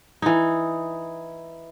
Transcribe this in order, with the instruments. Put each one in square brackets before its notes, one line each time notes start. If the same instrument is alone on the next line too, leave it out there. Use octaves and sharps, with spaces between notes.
[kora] E3 D#4